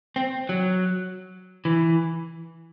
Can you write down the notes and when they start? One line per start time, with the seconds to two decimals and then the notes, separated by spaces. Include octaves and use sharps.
0.16 C4
0.49 F#3
1.65 E3